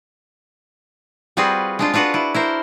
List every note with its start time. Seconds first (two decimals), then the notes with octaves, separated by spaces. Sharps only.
1.37 G3 C4 F4 F#4 G#4 B4
1.79 G#3 D4 F4
1.94 D4 F4 F#4 B4 F#5
2.14 E4
2.35 E4 A#4 C5